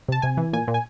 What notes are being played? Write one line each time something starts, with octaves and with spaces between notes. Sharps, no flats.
C3 A5
C3 G#5
E3
A#2 G#5
A#2
G#5